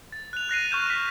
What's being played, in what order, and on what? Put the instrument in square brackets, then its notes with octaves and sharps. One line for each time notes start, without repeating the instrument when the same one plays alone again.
[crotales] A6
F#6 F7
F#6 A#6 C7 D#7
C#6 F6 G6 E7
F6 B6